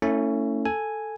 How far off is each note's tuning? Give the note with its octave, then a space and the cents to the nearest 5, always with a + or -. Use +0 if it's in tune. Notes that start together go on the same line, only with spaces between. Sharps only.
A3 +30 C#4 +0 E4 -25
A4 +0 G#5 +0